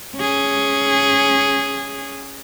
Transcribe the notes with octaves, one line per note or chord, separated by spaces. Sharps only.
C#4 G#4